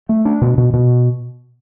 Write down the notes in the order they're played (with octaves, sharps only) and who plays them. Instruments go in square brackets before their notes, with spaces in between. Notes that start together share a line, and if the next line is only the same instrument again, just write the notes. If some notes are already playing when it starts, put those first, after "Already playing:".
[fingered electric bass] A3
D4
B2
B2
B2